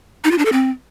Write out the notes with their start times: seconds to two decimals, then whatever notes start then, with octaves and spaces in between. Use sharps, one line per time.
0.24 D#4
0.31 F4
0.38 D4
0.45 A4
0.52 C4